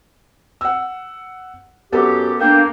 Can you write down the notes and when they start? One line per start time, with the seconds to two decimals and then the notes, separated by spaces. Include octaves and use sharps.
0.61 F#5 E6
1.92 F#2 B3 G4 A4
2.41 A#3 D4 G5